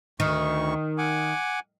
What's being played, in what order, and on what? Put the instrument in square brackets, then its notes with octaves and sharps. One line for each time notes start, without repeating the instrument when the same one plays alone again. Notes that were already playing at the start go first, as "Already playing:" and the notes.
[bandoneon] D2 C#6 [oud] D#3
[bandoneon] F#5 G#5 D6